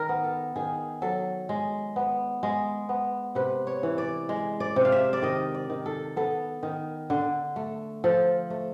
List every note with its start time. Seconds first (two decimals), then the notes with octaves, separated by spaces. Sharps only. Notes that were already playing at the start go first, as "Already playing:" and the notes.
Already playing: D#3 A#4
0.09 B3
0.24 A4
0.56 D#3 G#4
1.02 F#3 A4
1.49 G#3
1.96 B3
2.43 G#3
2.89 B3
3.35 C3 B4
3.67 C#5
3.83 E3
3.98 D5
4.29 G#3
4.60 D5
4.76 C3
4.85 F5
4.92 E5
5.13 D5
5.22 D#3 D#5
5.54 D5
5.70 D#3
5.86 A4
6.16 B3 A4
6.63 D#3
7.10 D3
7.56 A3
8.04 F3 A4
8.50 A3